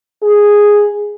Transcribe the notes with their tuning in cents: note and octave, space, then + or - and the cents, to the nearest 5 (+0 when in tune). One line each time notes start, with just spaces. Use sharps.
G#4 -5